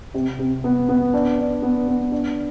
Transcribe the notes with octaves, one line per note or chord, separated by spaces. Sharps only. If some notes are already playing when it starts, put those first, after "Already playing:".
C3
C3
B3
B3
D4
D4
B3
B3
D4